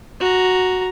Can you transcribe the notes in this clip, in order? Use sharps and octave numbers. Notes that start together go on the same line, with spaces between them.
F#4 A#5